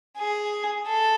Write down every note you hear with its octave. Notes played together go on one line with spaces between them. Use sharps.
G#4
A4